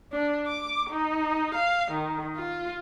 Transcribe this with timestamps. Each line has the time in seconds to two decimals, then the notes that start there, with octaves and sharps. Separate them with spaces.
0.12 D4
0.47 D6
0.90 D#4
1.55 F5
1.92 D#3
2.36 F4